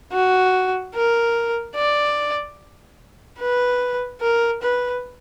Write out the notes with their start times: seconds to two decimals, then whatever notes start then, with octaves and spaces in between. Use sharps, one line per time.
0.13 F#4
0.94 A#4
1.76 D5
3.40 B4
4.21 A#4
4.62 B4